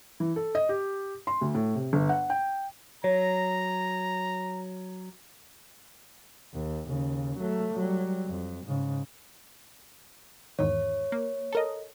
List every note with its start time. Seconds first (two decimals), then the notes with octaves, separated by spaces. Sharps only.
0.20 E3
0.36 A4
0.55 D#5
0.69 G4
1.27 C6
1.41 D2
1.54 A2
1.75 C3
1.93 G1
2.09 F#5
2.30 G5
3.04 F#3 C#5 A#5
6.54 D#2
6.88 D#2 C#3
7.39 F#3 A3
7.73 F#3 G3
8.26 F2
8.67 G#2 C#3
10.59 E2 G#2 D#3 C#5
11.12 A#3
11.53 A4 A#4 D#5